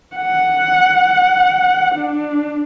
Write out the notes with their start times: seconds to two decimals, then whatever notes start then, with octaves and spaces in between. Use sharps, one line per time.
0.16 F#5
1.95 D4